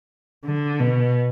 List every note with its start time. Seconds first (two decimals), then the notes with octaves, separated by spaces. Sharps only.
0.45 D3
0.80 B2